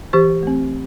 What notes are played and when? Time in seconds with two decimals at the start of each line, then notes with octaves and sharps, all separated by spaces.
0.13 E3 G4 C5
0.43 A3 C4